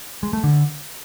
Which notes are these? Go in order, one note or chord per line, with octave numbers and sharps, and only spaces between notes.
G#3
A3
D3